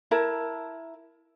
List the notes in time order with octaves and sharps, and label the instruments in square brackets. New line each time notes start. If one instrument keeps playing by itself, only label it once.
[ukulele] E4 A#4 A5